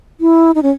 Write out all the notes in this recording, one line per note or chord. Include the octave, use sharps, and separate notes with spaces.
E4
D#4
C#4